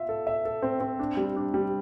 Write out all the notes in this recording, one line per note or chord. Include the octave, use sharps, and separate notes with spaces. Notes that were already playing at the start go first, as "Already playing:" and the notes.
Already playing: F4 E5
A4
E5
A4
C4
C4
D4
G3
D4
G3